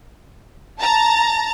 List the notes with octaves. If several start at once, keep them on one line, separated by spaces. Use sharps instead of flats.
A5 A#5 A6